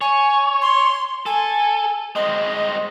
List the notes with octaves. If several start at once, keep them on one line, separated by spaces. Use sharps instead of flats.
C#5 G#5
C6
A4 G#5
G#3 C4 D#5